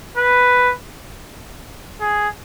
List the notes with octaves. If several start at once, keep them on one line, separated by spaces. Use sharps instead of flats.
B4
G#4